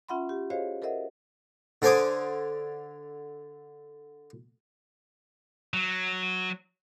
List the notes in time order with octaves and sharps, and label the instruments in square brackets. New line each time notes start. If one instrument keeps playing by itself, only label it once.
[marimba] C#4 F4 E5 F#5 B5 C6
G4
F#4 G#4 C5 C#5 D#5 F5
A4 A#4 C5 D#5 E5 F#5
[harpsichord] D3 A4 C5 G#5 D6 D#6
[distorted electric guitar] F#3